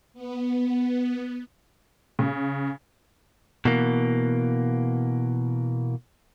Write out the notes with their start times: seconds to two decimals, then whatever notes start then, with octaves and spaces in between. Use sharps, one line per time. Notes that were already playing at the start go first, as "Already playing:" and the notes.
0.14 B3
2.19 C#3
3.65 B2 E3 A#3